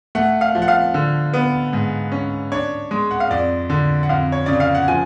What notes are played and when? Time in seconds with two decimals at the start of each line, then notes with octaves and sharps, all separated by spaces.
0.15 A3 F#5
0.41 F5
0.55 F3
0.62 F#5
0.68 F5
0.94 D3
1.34 B3
1.73 G#2
2.12 C#4
2.52 D4 C#5
2.91 G#3
3.11 F#5
3.20 F5
3.31 F2 D5
3.70 D3
4.03 F#5
4.09 F2 F5
4.32 C#5
4.46 C#3 D5
4.60 F5
4.75 F#5
4.88 F3 G#5